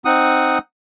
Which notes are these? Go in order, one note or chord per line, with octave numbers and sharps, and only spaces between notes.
C4 D#4 F#5 D#6